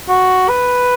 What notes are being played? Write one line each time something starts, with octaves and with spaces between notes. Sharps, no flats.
F#4
B4